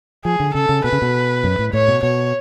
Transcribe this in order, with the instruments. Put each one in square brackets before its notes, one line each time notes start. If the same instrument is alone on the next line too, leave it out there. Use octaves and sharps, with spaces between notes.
[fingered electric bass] F3 [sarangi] G#4
[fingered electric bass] D3
[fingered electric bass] C#3 [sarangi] A4
[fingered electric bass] C#3
[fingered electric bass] B2 [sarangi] B4
[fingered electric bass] C#3
B2
F#2
A2
[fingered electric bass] A2 [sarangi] C#5
[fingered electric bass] B2
[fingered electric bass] B2 [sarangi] C#5